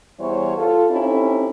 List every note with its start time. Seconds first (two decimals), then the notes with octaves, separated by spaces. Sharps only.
0.19 E2 E3 G3 C5 C#5
0.57 F4 A4
0.90 C4 C#4 D#4 E4 G4 A4